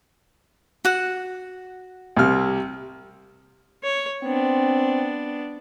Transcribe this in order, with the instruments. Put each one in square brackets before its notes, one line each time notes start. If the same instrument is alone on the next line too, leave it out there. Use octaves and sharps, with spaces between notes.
[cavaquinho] F#4 F#5
[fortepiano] C2 C3 F6
[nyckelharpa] C#5
[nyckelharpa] B3 D4 [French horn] C4